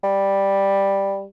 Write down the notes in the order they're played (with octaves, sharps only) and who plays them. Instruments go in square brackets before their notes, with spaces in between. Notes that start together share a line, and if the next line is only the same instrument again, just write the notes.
[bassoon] G3